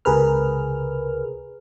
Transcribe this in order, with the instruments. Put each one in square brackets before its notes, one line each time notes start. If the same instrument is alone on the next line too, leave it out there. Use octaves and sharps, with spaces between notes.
[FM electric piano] C#2 C3 G#4 A#4 B4 F6